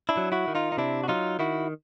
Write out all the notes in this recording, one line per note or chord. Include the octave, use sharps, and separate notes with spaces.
D4 E4
F#3
E4 F#4
D#3
D#4 F4
D#4
C3 D4 E4
F#4
F#3 D#4 F4
D#3 E4 F#4